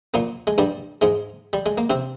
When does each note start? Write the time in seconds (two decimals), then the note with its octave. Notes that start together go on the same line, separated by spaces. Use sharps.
0.14 A#2 A#3
0.47 G#3
0.58 G2 G3
1.01 G#2 G#3
1.53 G3
1.66 G#3
1.78 A#3
1.90 C3 C4